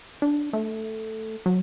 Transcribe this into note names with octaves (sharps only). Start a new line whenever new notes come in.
D4
A3
F#3